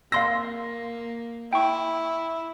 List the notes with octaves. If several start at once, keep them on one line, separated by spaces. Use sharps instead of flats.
A#3 F5 C6 E6 A#6
E4 G5 C#6